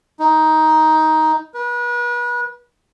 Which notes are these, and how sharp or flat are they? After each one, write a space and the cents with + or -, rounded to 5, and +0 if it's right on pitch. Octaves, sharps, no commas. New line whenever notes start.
D#4 +10
B4 -35